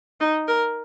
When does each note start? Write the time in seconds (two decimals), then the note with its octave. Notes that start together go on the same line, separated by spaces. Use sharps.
0.20 D#4
0.48 A#4